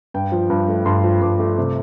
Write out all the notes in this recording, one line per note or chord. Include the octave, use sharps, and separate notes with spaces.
G2 G5
F3
G2
A3
G2 C6
F3
G2 D6
A3
C3